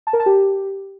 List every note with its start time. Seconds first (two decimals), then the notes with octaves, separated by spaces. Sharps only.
0.07 A5
0.13 A#4
0.20 A5
0.26 G4